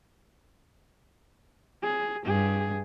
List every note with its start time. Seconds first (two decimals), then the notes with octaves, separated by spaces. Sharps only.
1.83 G#4
2.26 G2 G#4